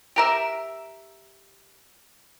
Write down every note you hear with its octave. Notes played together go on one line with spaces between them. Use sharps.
G4 A#4 E5